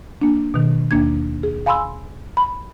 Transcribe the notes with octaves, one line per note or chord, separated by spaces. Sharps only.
A#3 D4
B2 D#3
D#2 A#3 D4 G#6
G#4
F5 G#5 B5 C6 E6
B5